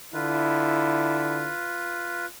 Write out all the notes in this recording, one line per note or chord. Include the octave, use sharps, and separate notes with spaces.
D3 E4 F4 B4